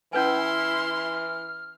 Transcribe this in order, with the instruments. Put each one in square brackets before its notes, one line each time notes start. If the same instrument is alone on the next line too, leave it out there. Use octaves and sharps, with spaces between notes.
[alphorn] E3 [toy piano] C#4 B4 G#5 [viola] E4 C6 [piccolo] F6